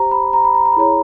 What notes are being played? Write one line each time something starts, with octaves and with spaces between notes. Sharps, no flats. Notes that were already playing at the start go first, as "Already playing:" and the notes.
Already playing: G4 C5 A#5
B5
A#5
B5
A#5
A#5
B5
E4 G#4 C#5 A#5